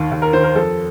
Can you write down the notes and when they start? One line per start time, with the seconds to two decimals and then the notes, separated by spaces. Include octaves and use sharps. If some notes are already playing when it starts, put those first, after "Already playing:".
Already playing: D#2 D#3
0.11 D#2
0.22 A#4
0.33 D#3 C5
0.44 A#4
0.55 F2 A4